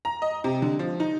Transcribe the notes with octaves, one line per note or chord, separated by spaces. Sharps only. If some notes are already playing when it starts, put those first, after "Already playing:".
A#5
D#5
C3
D3
F3
D#4